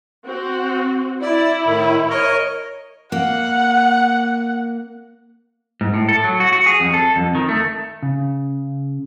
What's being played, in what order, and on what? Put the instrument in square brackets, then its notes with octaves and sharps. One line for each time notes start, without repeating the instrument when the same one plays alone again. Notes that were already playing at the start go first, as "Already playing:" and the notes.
[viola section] C4 F#4
[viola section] E4 [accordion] D5
[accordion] A2 D#3
[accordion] A#4 D#5 [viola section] C#5
[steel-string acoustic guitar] A#3 [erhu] F#5
[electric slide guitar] G#2
A2
A4
F#3
F#4
F#4
G#4
F2
A4
F2
D#3
A3
[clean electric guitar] C#3